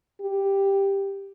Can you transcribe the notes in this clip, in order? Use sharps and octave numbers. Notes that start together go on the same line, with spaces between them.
G4